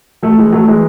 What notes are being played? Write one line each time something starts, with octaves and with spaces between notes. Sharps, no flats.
F#3 A3
E3 G#3
F#3 A3
E3 G#3